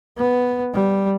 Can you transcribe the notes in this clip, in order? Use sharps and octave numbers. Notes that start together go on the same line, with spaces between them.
B3
G3